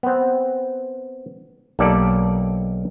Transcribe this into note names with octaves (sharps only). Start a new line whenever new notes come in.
B3 C4
B1 A#3 D#4 G4 A4 D5